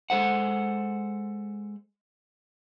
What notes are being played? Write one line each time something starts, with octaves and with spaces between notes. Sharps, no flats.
G#3 A4 C5 F#5